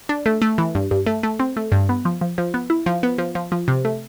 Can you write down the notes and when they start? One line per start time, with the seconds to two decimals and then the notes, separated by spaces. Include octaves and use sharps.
0.09 D4
0.26 A3
0.42 A3
0.58 E3
0.75 G2
0.91 G2
1.07 A3
1.23 A3
1.40 C4
1.57 A3
1.72 G2
1.89 B3
2.05 F3
2.21 F3
2.38 F3
2.54 B3
2.70 E4
2.86 F3
3.03 B3
3.18 F3
3.35 F3
3.52 F3
3.68 C3
3.85 A3